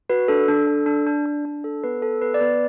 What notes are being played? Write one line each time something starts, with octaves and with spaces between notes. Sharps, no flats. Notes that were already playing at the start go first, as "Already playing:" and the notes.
F#4 B4
D4 A4
D4
A4
D4
D4
D4
D4
A4
B3 B4
A4
B3 B4
D5
B3 B4